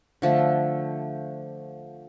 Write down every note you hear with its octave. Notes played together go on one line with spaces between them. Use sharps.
D3 F3 A3